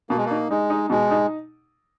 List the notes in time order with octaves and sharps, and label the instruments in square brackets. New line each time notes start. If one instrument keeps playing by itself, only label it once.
[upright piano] B2 [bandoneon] A#3
[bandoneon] G#3
[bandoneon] A#3 [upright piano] D#4
[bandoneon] G#3 [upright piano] D#4
[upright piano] D#4
[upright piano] B2 [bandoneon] G#3
[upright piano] D#4